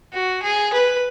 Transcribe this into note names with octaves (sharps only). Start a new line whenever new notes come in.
F#4
G#4
B4